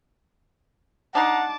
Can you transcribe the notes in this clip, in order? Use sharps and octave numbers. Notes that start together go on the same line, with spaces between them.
D4 D#4 F#5 A5 A#5 C6 D6